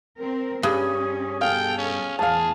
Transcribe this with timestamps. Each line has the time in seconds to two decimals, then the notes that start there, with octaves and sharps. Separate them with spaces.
0.17 C4 A#4
0.63 G2 C#4 G#4
1.41 B2 A4 F5 G5 G#5
1.78 C#4
2.19 E2 A2 E3 G#4 F5 A5